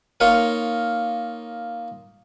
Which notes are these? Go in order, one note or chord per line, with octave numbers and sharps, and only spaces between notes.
A#3 D#4 F4 A#4 C#5